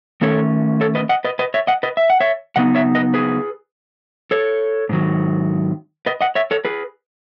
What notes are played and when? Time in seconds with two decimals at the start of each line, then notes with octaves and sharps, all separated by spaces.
0.22 D#3 A3 C#4 A4 C#5
0.81 A4 C#5
0.95 B4 D#5
1.09 D#5 F#5
1.24 B4 D#5
1.39 B4 D#5
1.54 C#5 E5
1.67 D#5 F#5
1.83 B4 D#5
1.97 E5
2.10 F#5
2.20 C#5 E5
2.56 C#3 F#3 B3 D#4 D#5 F#5
2.75 C#5 E5
2.95 B4 D#5
3.14 G#4 B4
4.31 A4 C#5
4.89 G#2 D#3 F#3
6.06 B4 D#5
6.21 D#5 F#5
6.35 C#5 E5
6.51 A4 C#5
6.65 G#4 B4